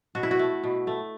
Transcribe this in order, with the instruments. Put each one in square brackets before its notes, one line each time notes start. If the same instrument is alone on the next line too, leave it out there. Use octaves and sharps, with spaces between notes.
[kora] B2 F#4
E4
F#4
A3
B2
A3